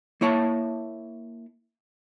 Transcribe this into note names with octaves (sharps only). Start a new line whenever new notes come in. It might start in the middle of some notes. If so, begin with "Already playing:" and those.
A#3 E4 C#5 E5 A5